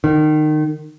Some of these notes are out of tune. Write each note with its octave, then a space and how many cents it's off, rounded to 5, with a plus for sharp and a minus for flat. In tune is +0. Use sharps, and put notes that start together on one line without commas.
D#3 -25